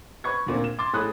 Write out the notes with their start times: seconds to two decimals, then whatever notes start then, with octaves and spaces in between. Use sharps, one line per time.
0.24 B4 C#6 G#6
0.46 D2 A#2 C4
0.64 E7
0.79 C6 D6 A6
0.94 A2 G#4 A4 B5 D#6 F#6